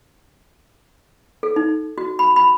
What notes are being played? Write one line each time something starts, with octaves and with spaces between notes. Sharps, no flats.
A4
D#4
F#4
B5
B5